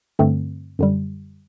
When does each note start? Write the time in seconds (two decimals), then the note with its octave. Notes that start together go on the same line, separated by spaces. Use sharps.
0.19 G2 D3 A3 C4
0.79 F#2 D3 G3